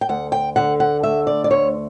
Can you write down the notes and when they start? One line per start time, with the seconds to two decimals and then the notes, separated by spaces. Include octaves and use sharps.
0.01 G5
0.09 D2 F#5
0.32 G5
0.56 D3 F#5
0.80 F#5
1.03 A3 E5
1.27 D5
1.44 D5
1.50 D2 C#5